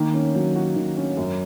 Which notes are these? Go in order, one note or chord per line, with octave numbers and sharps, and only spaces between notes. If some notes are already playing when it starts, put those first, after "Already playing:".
Already playing: D#3 A#3
C#4
F#3
F#4
D#3
C#4
F#2